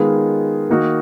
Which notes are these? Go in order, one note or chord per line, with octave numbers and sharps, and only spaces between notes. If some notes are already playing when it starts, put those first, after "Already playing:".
Already playing: D#3 G#3 B3 F4 G#4
D#3 A#3 D#4 F#4